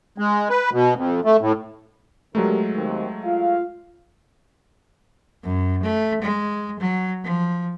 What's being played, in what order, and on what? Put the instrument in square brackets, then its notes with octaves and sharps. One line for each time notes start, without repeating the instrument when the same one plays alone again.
[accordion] G#3
B4
B2
F2
A3
A2
[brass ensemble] D3 G4 A#4 [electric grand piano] F#3 G#3 A3
[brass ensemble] D#2 D#3 C4
F4 F5
[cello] F#2
A3
G#3
F#3
F3